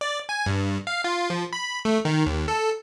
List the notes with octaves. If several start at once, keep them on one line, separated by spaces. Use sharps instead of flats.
D5
G#5
G2
F5
F4
F3
B5
A3
D#3
D#2
A4